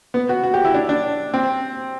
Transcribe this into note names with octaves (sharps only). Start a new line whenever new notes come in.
B3
F#4
F#4
G4
E4
D4
D4
C4